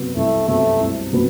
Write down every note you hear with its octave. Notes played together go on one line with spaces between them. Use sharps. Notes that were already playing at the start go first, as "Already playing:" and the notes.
Already playing: C3 F#3 B3
C2 A3
C3 F#3 A3 B3
C2
C3 F#3 B3